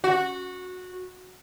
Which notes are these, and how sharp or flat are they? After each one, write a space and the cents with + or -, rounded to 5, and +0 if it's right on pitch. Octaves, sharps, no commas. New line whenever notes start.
F#4 -15